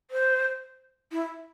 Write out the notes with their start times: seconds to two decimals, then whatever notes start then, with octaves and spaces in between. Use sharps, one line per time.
0.11 C5
1.12 E4